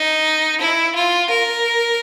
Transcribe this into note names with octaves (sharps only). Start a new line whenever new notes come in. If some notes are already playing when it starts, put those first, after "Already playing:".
Already playing: D#4
E4
F4
A#4